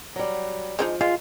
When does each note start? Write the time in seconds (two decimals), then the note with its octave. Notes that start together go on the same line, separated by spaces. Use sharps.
0.16 F#3 G3
0.79 F3 G#3 D4 D#4
1.01 G#3 F4